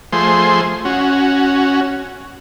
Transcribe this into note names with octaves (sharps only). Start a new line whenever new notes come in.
F3 A3 G#4 C5 C6
C#4 F#4